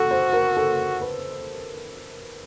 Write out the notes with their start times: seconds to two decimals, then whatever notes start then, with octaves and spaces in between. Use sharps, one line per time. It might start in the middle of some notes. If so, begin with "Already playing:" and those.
Already playing: F#4 A4
0.11 C5
0.33 A#4
0.57 A4
1.02 B4